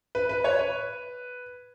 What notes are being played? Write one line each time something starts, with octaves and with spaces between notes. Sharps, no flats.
B4
B4
C#5
B4